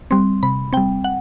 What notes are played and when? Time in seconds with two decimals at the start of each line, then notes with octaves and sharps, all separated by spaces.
0.11 G3 C4 C6
0.43 C3 B5
0.73 G3 C4 G5
1.04 F#5